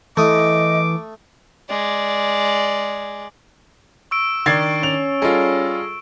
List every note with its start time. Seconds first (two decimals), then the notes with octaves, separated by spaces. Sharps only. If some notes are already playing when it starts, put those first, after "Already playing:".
0.17 E3 A3 D#5 D6 D#6
1.69 G#3 D5
4.11 C#6 E6 D7
4.46 D#3 D4 D5 G#6 A6 C7
4.83 C#4 F7
5.22 G3 F4 G#4 A4 D#5